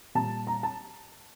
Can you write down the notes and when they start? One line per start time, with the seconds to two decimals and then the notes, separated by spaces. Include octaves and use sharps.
0.15 A#2 G3 A5
0.47 A#5
0.63 A5